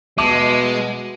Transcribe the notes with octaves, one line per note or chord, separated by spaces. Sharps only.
B2 G#3 E5 A5 D6